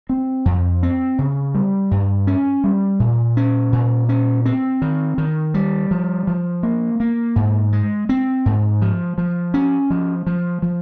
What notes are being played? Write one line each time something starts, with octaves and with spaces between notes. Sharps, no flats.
C4
F2
C4
C#3
G3
G2
C#4
G3
A#2
C#4
A#2
C#4
C4
D#3
D#3
G3
F3
F3
A#3
A#3
G#2
G#3
C4
G#2
F3
F3
C#4
F3
F3
F3